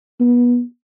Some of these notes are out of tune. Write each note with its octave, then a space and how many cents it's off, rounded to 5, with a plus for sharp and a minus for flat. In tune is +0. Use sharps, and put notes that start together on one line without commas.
B3 -25